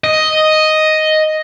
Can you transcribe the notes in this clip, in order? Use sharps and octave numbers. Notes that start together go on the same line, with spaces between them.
D#5